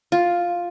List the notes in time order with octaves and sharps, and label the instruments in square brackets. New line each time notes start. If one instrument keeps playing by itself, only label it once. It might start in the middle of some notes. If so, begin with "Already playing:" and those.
[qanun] F4